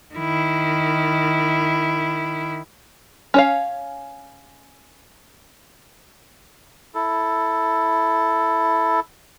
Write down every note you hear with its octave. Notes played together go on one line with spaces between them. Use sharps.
D#3 E4
C#4 C#5 F5
E4 A4